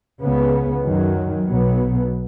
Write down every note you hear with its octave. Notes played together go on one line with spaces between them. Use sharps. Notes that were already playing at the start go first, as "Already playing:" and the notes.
C#2 C#3 B3
F#2 D#3 F#3
B1 B2 F#3 B3